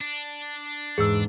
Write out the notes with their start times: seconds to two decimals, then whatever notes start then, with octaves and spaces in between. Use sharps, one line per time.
0.01 D4
0.98 E2 G#2 G#4 E6